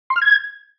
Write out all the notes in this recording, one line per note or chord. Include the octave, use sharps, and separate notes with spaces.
C6
F6
G#6